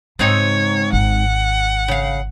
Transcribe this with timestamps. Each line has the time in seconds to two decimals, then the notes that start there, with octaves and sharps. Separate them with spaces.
0.19 G#2 C#3 C4 D#4 C#5
0.93 G#1 F#5
1.88 C#3 F5